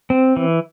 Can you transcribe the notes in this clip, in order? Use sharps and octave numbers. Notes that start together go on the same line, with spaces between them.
C4
E3